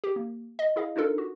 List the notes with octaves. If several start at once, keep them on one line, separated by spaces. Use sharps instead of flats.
G4
A#3
D#5
E4 G#4 D#5 F5
D4 D#4 F4 A4 A#4
F#4